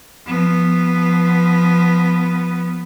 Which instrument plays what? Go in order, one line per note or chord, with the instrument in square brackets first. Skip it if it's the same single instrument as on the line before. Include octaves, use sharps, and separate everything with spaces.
[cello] F3 B3